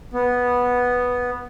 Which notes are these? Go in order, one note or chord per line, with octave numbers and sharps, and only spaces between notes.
B3